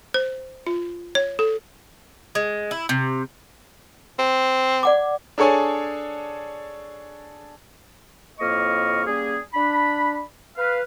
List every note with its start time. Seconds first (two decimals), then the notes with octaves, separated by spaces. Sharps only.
0.14 C5
0.67 F4
1.15 C#5
1.39 A4
2.35 G#3
2.71 E4
2.89 C3
4.19 C4
4.83 D5 F#5 D6
5.38 D4 G#4 A4 C#5 G#5
8.40 F2 A2 A#3 D#5 C#6 F6
9.06 G3 A#3 C#4 G#4
9.54 D4 B5
10.57 B4 F5